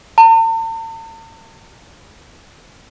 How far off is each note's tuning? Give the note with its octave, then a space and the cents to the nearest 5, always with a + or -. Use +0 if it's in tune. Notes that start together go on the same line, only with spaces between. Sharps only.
A5 +45